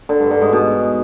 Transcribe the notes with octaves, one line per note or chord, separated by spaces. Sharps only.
D3
G2
D3
G#2
B2